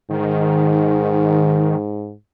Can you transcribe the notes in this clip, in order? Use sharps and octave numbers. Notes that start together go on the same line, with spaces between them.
G#2 D#3